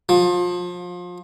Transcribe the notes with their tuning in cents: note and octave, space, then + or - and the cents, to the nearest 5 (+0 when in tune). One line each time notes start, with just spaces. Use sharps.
F3 +30